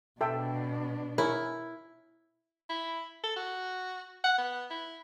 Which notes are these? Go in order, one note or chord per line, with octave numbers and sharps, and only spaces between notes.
B2 D4 A4 E5 G5
E4 G#4 A#4 C#5
E4
A4
F#4
F#5
B3
E4